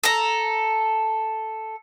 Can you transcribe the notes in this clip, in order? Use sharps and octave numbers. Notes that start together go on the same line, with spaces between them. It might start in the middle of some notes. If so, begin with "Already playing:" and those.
A4 A#5